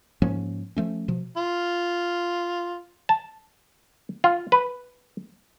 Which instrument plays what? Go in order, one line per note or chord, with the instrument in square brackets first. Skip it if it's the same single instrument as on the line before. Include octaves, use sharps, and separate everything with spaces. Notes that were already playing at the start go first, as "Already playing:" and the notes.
[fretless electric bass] G#2 F3 A#3 C#4
F3 A3 C#4
B2 F3
[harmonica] F4
[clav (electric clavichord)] A5
F4
B4